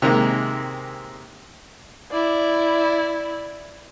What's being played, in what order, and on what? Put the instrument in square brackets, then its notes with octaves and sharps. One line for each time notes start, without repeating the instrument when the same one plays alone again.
[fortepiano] C3 D#3 G#3 A#3
[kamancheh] E4 D5